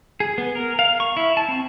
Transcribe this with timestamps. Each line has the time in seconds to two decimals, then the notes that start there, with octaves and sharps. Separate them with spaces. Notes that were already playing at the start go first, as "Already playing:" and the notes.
0.20 G#4
0.38 B3
0.55 A#4
0.79 F5
1.00 C#6
1.17 E4
1.37 A5
1.49 C4